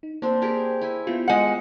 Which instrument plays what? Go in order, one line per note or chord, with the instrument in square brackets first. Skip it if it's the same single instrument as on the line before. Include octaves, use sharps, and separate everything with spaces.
[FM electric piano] D#4
[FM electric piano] A#3 [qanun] C4 D4
[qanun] G4 G#4 A#4
E4 G#5
[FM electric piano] B3 E4 F4 [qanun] G4
[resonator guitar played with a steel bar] G#3 F#5